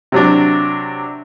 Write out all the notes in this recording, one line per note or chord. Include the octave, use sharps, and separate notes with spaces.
C3 F#3 D4